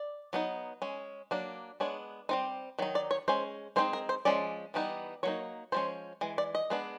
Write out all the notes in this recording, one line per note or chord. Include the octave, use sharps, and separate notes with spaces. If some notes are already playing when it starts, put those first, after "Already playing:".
Already playing: D5
F#3 B3 D#4
G#3 C#4
F#3 A#3 D4
G#3 B3 D4 C#5
G3 C4 D#4 C5
D#3 F#3 D#4
D5
C#5
G#3 C#4 C5
G#3 C4 D#4 C5
A#4
C5
F3 G#3 C#4 D5
E3 G3 B3 D#4
F#3 A#3 D#4 C#5
F3 G#3 C#4 C5
E3 G#3
D5
D#5
G#3 B3 D4